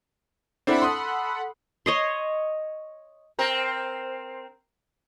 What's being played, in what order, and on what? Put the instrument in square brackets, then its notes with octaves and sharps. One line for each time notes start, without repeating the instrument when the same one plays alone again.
[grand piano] C4 D4 E4 [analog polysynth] A4 F#5 B5
[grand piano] C6 D#6
[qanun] C#5 D#5 C6
[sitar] C4 A#4